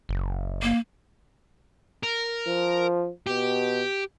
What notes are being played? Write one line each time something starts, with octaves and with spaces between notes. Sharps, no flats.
F#1
A#3
A#4
F3
B2 G4